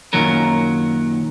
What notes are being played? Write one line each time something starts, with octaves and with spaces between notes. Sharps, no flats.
F#2 A#2 D#3 F#3 A#4